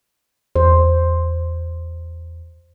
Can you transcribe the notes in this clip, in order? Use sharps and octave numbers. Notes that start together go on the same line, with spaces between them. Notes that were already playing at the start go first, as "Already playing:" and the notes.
E2 C5